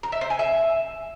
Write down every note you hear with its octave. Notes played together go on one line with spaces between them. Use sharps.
A#5
E5
C5
G#5
E5